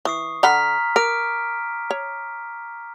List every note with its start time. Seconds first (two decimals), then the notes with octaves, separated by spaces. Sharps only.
0.05 E3 C#6 D#6 C7
0.43 D3 F#5 A#5 B5 F6 B6
0.96 A#4 D6 F6 D7
1.91 C#5